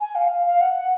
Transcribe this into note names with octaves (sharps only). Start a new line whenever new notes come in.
G#5
F5
F5
F5
F#5